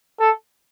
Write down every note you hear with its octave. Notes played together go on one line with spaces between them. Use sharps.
A4